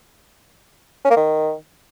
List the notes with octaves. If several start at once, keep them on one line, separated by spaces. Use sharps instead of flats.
C#4
A#3
D#3